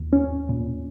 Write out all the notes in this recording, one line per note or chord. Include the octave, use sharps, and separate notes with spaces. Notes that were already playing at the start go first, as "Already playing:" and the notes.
Already playing: D#2
C#4
A#2